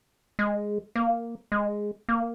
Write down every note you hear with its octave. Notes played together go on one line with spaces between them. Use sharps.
G#3
A#3
G#3
A#3